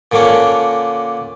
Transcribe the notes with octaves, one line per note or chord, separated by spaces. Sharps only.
A#2 D3 A#3 C#4 D4